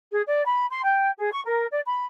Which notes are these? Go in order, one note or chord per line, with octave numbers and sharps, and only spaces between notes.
G#4
D5
B5
C6
G5
G#4
C#6
A#4
D5
B5